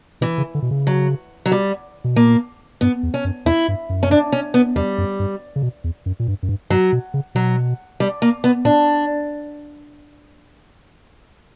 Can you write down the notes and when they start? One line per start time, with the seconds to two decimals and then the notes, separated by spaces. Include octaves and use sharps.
0.21 B2 E3
0.38 C#3
0.55 D3
0.62 B2
0.71 C#3
0.87 F#3
1.46 F#3
1.52 G3
2.04 B2
2.16 A#2 A#3
2.81 G2 B3
3.03 E2
3.14 C#4
3.25 F#2
3.46 E2 E4
3.68 G2
3.90 F#2
4.03 C#4
4.11 D4
4.32 C#4
4.54 B3
4.76 E2 G3
4.98 F#2
5.20 G2
5.56 C#3
5.62 B2
5.84 E2
6.06 F#2
6.20 A#2
6.28 G2
6.43 F#2
6.49 G2
6.70 G2 F#3
6.92 B2
7.14 C#3
7.35 B2 F#3
8.00 G3
8.22 A#3
8.44 B3
8.65 A#2 D4